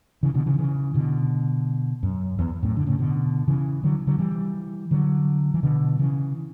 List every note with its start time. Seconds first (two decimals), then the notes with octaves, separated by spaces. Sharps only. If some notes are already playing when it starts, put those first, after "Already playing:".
0.23 C#3 E3
0.34 B2 D3
0.46 C#3 E3
0.54 D3
0.59 C#3 E3
0.94 B2 D3
2.03 F#2
2.39 E2
2.63 F#2 A2
2.77 D3
2.87 A2 C#3
2.99 B2 D3
3.48 C#3 E3
3.84 D3 F#3
4.07 D3 F#3
4.19 E3 G3
4.91 D3 F#3
5.54 E3
5.63 B2 D3
5.99 C#3 E3